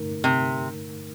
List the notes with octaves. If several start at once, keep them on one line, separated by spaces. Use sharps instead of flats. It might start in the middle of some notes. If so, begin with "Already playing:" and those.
Already playing: G2 D3 A3 D#4 A#4
C3